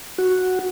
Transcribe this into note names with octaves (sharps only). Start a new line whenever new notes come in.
F#4